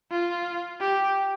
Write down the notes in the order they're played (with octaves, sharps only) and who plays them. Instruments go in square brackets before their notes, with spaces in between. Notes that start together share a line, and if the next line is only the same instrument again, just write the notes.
[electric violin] F4
G4